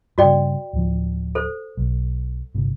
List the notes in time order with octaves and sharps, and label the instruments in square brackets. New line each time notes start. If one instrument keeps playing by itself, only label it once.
[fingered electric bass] G2 C#3 [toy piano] F#4 D5 G5
[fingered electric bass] D1 F3
[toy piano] A4 C5
[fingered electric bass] B1
G1 C3